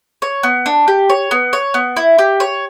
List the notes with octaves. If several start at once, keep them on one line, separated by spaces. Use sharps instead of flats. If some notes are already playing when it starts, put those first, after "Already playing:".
C#5
B3
D4
G4
C#5
B3
C#5
B3
E4
G4
C#5